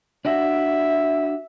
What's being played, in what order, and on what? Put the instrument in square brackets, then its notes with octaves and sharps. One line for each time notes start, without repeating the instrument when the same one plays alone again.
[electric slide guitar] D4 F#4 [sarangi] E5